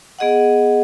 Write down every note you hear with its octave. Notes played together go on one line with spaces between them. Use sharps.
B3 G#4 D#5 F#5